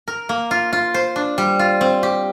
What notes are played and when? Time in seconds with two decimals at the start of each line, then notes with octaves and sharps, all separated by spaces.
0.08 A#4
0.29 A#3
0.51 F4
0.73 F4
0.94 C5
1.16 D4
1.38 G3
1.59 F4
1.81 C4
2.03 G4